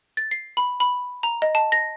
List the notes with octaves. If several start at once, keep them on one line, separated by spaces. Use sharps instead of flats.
A6
C7
B5
B5
A#5
D#5
A5
A#6